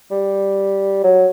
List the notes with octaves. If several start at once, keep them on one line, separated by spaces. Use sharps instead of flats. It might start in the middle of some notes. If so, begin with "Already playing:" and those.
G3
F#3